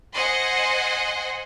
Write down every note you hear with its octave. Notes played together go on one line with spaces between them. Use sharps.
C5 D#5 F#5 G#5 C6